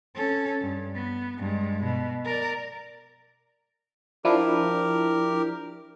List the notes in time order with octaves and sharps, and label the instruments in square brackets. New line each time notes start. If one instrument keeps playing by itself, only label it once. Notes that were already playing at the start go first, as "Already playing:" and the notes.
[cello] C#4 A4
G2
B3
G2 G#3
B2
A#4 D5
[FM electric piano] F3 D4 E4 [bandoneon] G4 A#4